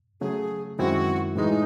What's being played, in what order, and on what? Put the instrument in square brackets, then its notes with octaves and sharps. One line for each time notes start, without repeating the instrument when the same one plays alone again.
[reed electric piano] C#3 F#3 A3 [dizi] G#4
[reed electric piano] F#2 D#3 G#3 C4 E4 [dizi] F#4
[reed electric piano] A2 E3 G#3 [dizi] D#4